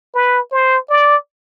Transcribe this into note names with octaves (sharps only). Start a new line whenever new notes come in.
B4
C5
D5